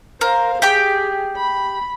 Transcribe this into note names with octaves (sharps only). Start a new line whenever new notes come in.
A#4 C5 F5
G4 G#4 G5 D6
B5